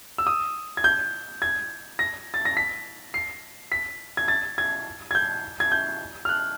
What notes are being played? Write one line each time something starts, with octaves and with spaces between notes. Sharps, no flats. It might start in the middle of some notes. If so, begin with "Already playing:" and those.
E6
D#6
G#6
G6
G#6
A#6
A6
A#6
B6
C7
B6
G#6
A6
G#6
G#6
G6
G#6
G6
F6
F#6